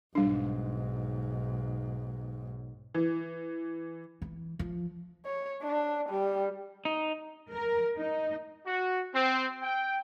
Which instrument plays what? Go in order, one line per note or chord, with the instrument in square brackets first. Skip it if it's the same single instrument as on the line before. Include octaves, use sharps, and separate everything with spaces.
[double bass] B1 G#2 [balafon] G3 D4
[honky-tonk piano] E3
[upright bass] E3
F3
[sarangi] C#5
D4
G3
[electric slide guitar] D#4
[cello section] A#4
D#4
[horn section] F#4
C4
G5